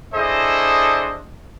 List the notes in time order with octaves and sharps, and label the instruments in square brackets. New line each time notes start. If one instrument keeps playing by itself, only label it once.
[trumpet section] D4 E4 G#4 A4 C5 D#5